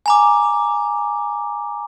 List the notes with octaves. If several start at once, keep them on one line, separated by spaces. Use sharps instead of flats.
G#5 A#5 D6